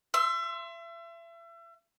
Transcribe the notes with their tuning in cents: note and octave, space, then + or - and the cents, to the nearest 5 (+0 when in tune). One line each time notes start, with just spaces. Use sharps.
E5 +35 C6 +5 E6 -5